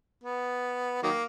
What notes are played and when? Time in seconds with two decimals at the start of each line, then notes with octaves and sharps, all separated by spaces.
0.23 B3
1.03 D#3 F#3 A#3